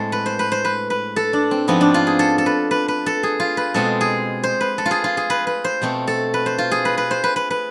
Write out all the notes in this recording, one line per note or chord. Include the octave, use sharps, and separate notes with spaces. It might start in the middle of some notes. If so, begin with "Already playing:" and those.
Already playing: A2 G#3 C4 A4
B4
C5
B4
C5
B4
B4
A4
D4
C4
G#2 F3 B3 C4
D4
F4
G#4
A4
A4
B4
B4
B4
A4
G#4
F4
B4
B2 G#3 C4 A4
G#4
C5
B4
A4
F4
G#4
F4
G#4
B4
B4
C5
B2 A3 C4
A4
B4
C5
F4
G#4
B4
B4
C5
B4
B4
B4